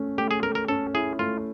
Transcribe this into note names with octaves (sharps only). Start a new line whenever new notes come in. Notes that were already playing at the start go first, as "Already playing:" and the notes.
Already playing: A3 C#4
A3 G4
G#4
A3 A#4
A#4
C#4 A4
E4 G#4
A3 F4